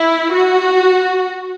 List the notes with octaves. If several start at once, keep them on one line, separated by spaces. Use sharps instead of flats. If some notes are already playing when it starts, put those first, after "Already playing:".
Already playing: E4
F#4